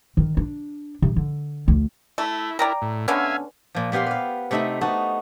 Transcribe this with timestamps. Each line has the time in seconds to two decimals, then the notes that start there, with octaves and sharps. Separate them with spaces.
0.17 D#3
0.37 D4
1.02 C3
1.16 D3
1.68 D2
2.18 A3 E4
2.59 E4 A#4 D5 G5 A#5
2.82 A2
3.08 D3 B3 C#4 E5 F5 G#5
3.75 A#2 F3
3.92 A#2 B3 G4 F5 C6
4.06 B4 F5
4.51 C3 A3 D#4 E5 B5
4.81 B3 D#4 F#4 A5